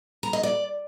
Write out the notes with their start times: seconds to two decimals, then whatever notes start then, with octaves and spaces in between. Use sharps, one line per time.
0.23 A#5
0.33 D#5
0.43 D5